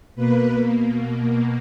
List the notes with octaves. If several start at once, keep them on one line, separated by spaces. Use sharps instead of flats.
B2 A#3 B4